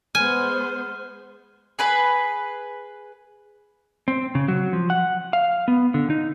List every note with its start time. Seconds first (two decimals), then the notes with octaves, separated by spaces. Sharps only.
0.15 G#3 B3 C5 G#5 F6
1.79 G#4 B4 B5
4.08 C4
4.35 C#3
4.48 F#3
4.73 F3
4.90 F#5
5.33 F5
5.68 B3
5.94 D3
6.10 D#4